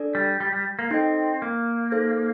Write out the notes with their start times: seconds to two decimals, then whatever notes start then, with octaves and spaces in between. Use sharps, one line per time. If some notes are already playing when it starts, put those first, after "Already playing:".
Already playing: D4 A4 D5
0.15 G3
0.40 G3
0.53 G3
0.79 A#3
0.91 C4 D#4 A4 D#5 G5
1.42 A#3
1.92 D#4 A4 C5